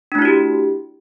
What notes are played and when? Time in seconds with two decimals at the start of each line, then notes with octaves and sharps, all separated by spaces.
0.12 D4
0.15 A3
0.18 E4
0.22 F#4
0.25 G4